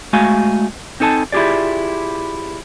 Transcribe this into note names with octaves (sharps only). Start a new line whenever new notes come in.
G#3 A3 F#4 F5 G#5
C4 D#4 A4 G#5 A5
E4 F4 G4 G#4 D5